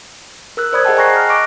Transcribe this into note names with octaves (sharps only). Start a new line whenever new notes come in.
A#4 E6 F#6
C5 D5 B5 D#6 G#6
G#4 D#5 F#5 G5 A5
G#5 A#5 C#6 F#6 A#6 C7
F6
D#5 C#6 D6 F#6 A#6 D7